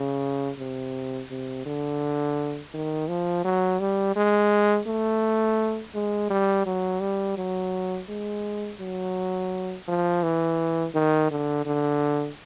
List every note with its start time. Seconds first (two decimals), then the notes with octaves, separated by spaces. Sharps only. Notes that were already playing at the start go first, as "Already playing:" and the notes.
Already playing: C#3
0.59 C3
1.31 C3
1.66 D3
2.74 D#3
3.08 F3
3.44 F#3
3.80 G3
4.16 G#3
4.87 A3
5.94 G#3
6.30 G3
6.66 F#3
7.01 G3
7.37 F#3
8.09 G#3
8.80 F#3
9.88 F3
10.23 E3
10.95 D#3
11.31 D3
11.66 D3